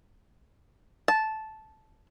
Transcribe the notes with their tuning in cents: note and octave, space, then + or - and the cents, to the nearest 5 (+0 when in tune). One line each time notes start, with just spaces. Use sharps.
A5 -10